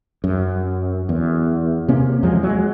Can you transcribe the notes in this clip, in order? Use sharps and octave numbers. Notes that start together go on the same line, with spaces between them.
F#2
E2
C3 A#3 C#4
E2 F3 F#3 G#3
F#3 G#3